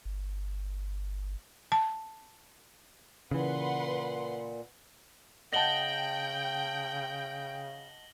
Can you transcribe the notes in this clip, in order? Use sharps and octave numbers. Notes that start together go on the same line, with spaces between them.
G1
A5
A#2 C#3 E3 B4 F#5 C6
C#3 D#5 F#5 G5 A5 A#6 F#7 G7